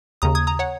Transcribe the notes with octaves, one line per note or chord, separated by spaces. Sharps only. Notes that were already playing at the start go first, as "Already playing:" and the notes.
D#2 C#3 A#5 D#6
D#6 G#6
A#5 D#6
C#5 F#5